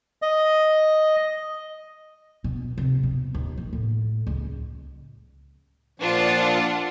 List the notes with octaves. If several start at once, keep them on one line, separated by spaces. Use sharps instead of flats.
D#5
B2
C3
B2
D#2
E3
A2
C#2
A#2 F3 D4 F4 F#5